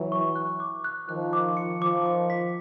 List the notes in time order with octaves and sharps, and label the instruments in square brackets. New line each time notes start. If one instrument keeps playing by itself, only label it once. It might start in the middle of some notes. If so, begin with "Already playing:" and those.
Already playing: [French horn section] E3 F#3
[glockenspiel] C#6
F#6
D6
F#6
[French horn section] D#3 F3 [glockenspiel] F#6
[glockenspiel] D6
C#7
[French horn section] D#3 F3 [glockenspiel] D6
[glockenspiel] D6
B6